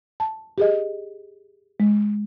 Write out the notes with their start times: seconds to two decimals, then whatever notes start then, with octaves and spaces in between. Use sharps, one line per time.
0.20 A5
0.58 G4 G#4 D#5
1.80 G#3